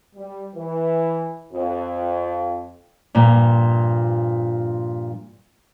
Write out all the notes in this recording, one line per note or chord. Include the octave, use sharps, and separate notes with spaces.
G3
E3
F2
G2 A#2 F3